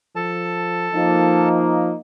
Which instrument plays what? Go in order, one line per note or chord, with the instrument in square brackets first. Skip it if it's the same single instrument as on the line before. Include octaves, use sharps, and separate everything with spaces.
[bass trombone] F3 [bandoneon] A4 A5
[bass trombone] F3 [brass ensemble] A#3 D#4